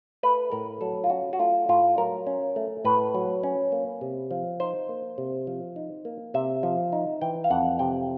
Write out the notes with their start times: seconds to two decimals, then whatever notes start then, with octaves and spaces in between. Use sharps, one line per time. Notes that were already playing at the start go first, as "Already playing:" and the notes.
0.23 A3 B4
0.52 A2 A#4
0.81 F#3 A4
1.04 F4
1.10 C#4 F#4
1.33 F#4
1.39 A3 F4
1.69 A2 F4
1.98 F#3 A#4
2.27 C#4
2.56 A3
2.85 A2 B4
3.15 F#3
3.43 C#4
3.72 A#3
4.01 C3
4.31 F3
4.60 D#4 C5
4.89 A#3
5.18 C3
5.47 F3
5.76 D#4
6.05 A#3
6.34 C3 E5
6.63 F3
6.93 D#4
7.21 E3 G5
7.44 F5
7.51 F2 F#5
7.79 C3 G5